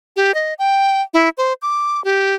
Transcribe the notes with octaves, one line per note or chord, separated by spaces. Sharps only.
G4
D#5
G5
E4
C5
D6
G4